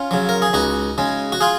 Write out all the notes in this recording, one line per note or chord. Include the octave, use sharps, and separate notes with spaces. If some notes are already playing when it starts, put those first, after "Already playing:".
Already playing: C#4 F4
C#3 F#3
A#4
G#4
C#2 D#4 F#4
C#3 G#3
F#4
F4 G#4